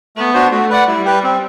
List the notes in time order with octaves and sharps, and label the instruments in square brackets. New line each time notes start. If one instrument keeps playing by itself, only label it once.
[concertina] A3 [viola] B3
[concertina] D4 F#4 C5
[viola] A3 [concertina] F#4
[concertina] B4 D5 F#5
[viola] G3 [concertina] E4
[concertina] G4 B4
C4